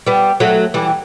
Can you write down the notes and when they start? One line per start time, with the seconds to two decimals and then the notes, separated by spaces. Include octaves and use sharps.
0.07 G3 B3
0.40 F#3 A3
0.74 E3 G3